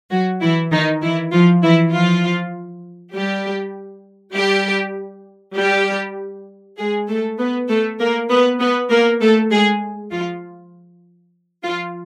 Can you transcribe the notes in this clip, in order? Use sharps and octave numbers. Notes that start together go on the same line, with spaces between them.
F#3 F#4
E3 E4
D#3 D#4
E3 E4
F3 F4
E3 E4
F3 F4
G3 G4
G3 G4
G3 G4
G#3 G#4
A3 A4
B3 B4
A3 A4
A#3 A#4
B3 B4
B3 B4
A#3 A#4
A3 A4
G#3 G#4
F3 F4
F3 F4